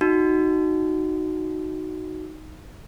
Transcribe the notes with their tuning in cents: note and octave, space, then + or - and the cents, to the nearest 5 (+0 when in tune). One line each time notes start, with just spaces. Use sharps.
D#4 +0 F#4 +0